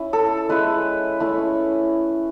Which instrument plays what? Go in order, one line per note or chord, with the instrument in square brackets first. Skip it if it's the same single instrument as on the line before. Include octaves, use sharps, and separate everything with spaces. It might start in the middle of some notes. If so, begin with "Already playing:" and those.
Already playing: [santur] C#4 E4
A4
G#3 C#4 E4 B4
A3 C#4 E4